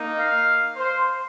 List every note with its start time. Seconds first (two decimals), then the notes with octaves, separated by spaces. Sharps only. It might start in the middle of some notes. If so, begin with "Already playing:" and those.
Already playing: A#3 D#4
0.17 F5
0.76 C5